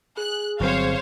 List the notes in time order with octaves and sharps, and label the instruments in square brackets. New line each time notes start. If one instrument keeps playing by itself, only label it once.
[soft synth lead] G#4 [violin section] F#6
[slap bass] G1 [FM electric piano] F#3 C4 [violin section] C5 C#5 F5